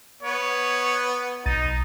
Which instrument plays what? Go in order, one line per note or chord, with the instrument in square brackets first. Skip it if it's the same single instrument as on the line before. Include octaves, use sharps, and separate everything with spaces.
[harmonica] B3 [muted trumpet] C#5
[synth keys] B1 A6 D#7 [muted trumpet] D#4